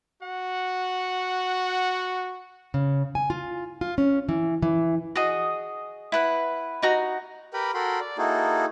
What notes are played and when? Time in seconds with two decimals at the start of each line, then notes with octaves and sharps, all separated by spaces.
0.22 F#4 F#5
2.74 C#3
3.15 G#5
3.30 F4
3.81 F4
3.98 C#4
4.29 E3
4.62 E3
5.15 F#4 G#4 D#5
6.12 E4 B4 F#5
6.82 D#4 F#4 A#5
7.53 G4 A#4 B4 G5 B5
7.74 F#4 A4 A#4 G5 B5 C6
8.00 D5
8.18 A#3 D#4 E4 F#4 G#4 A4